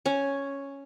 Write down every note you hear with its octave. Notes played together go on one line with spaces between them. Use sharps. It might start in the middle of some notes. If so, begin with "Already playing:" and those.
C#4